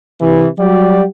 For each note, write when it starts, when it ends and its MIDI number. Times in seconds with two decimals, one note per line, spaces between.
0.21 0.46 48
0.21 0.46 52
0.59 1.04 54
0.59 1.04 55
0.59 1.04 66
0.59 1.04 67
0.59 1.04 74